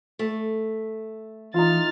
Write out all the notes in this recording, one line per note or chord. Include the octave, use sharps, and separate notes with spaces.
A3
E3 D#4 F4 F6 A6